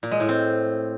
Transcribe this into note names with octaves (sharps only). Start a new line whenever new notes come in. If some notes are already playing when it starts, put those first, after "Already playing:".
A#2
G#3
A2
C4